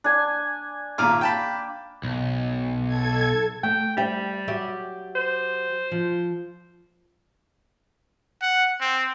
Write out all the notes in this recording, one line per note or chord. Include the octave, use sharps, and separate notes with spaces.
D4 G#5
G#1 A#2 A#3 D6 F6
G5 A5 B5
B1
A4 G#6
A3 G5
G3 C5 E5 G5
F#3 G4 E5
C5
F3
F#5
C4